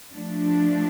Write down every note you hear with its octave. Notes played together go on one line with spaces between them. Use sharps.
F3 A3 D4